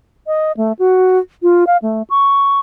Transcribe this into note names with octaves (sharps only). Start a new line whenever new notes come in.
D#5
A3
F#4
F4
F5
A3
C#6